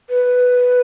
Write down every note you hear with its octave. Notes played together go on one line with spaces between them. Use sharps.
B4